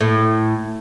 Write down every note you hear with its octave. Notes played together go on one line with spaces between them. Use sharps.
A2